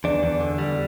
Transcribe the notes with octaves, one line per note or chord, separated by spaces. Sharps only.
E2 D4
E2
D3
G3